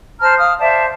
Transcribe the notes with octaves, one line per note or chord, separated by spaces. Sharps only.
C5 A5 A#5 F6
F5 D#6 F6
C5 D5 E5 A5